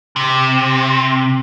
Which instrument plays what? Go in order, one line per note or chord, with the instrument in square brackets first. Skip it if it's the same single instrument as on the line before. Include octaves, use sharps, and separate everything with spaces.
[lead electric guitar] C3